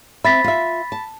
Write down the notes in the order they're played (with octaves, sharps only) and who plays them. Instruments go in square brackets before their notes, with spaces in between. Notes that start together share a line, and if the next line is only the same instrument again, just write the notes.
[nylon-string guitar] C4 E5 [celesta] B5 A6 B6
[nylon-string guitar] F4 E5
A5